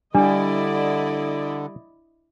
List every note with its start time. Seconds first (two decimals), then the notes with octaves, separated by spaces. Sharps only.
0.15 D3 G3 D4 E4 D5 D#5